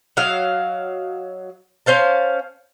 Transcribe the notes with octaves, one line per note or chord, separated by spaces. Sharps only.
F#3 D#5 F5
C#4 C5 F5 A5